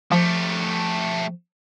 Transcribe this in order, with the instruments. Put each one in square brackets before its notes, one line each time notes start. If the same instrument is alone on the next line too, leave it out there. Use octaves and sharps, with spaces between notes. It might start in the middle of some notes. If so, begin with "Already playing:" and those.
[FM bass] F3 [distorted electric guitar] A3 G4